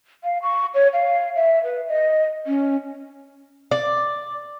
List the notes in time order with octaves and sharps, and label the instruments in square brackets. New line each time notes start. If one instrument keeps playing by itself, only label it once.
[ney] F5
C#6
C#5
F5
E5
B4
D#5
C#4
[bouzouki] D5